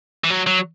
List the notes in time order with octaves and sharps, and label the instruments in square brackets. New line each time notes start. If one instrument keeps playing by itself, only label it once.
[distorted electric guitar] E3
F#3
F#3